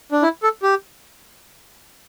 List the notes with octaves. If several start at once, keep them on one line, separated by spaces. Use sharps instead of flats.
D4
E4
A4
G4